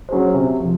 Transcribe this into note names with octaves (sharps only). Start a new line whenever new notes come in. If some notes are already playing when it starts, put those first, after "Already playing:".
F#3 C#4 G#4 C5
C3
F3